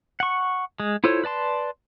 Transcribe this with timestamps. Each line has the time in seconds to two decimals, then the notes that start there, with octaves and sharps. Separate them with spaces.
0.20 F#5 C#6
0.80 G#3
1.04 E4 F4 A4 C5 C#5
1.24 B4 D5 A5 C6